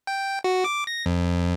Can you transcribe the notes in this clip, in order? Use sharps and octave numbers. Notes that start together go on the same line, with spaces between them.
G5
F#4
D6
A#6
F2